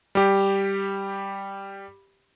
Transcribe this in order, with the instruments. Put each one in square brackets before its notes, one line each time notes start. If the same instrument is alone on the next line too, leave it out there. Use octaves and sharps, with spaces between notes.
[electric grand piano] G3 G4